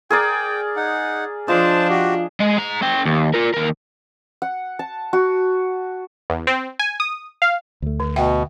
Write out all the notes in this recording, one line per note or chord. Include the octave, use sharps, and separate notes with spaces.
G#4 A#4 D5 G5
D#4 F#5
F3 D4 F4 C5 D#5 A5
F#4 G4
G#3 D#5
G#4 A#5
C#4 G5
D#2
F4 A#4
D#2 A#4
F#5
A5
F#4
E2
C4
G#5
D#6
F5
D2 A3
D3
B2 E5 F#5 G5